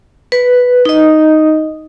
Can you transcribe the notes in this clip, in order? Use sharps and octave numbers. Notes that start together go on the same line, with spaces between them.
B4
D#4 D#5